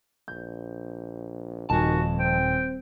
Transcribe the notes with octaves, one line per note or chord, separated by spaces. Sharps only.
A#1 G6
D#1 F2 D#3 F#4 G#5 A5
C4 G5